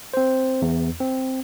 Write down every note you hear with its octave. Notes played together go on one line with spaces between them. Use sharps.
C4 C5
E2
C4